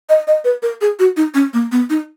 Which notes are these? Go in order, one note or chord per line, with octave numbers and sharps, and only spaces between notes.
D#5
D#5
B4
A#4
G#4
F#4
D#4
C#4
A#3
B3
D#4